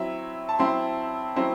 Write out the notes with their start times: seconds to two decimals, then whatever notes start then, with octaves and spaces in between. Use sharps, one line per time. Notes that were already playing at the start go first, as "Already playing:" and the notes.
Already playing: F#3 C4 E4 E5
0.49 A5
0.59 F#3 C4 E4 C6
1.36 F#3 C4 E4